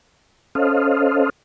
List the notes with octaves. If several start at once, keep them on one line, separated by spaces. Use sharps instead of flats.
C#4 A4 C5 D#5 F5